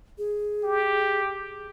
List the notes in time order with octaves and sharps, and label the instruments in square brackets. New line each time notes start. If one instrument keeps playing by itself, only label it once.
[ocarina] G#4
[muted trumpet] G4